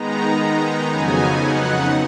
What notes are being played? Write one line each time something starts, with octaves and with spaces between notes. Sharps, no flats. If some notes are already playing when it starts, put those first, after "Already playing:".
Already playing: D#3 G#3 B3 D#4 A#5
F2 C#3 F#3 B3 D#4 G#5
F#5